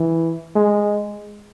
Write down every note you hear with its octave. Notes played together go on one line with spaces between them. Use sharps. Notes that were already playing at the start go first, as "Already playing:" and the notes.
Already playing: E3
G#3